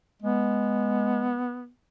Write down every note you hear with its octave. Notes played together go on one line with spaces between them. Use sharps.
G#3 B3